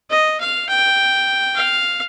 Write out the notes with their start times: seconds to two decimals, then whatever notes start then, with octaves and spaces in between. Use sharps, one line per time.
0.11 D#5
0.40 F5
0.69 G5
1.56 F5